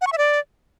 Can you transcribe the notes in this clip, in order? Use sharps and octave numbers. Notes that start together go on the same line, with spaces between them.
F#5
C#6
E5
D5